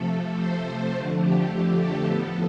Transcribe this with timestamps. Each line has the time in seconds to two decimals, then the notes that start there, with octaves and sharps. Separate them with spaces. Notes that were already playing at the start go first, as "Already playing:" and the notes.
Already playing: C3 F3 A3 A4
0.38 C5
0.66 C5
0.94 F2 D3 F3 A3
1.22 G4
1.79 A4
2.06 A2 F3 B3 A4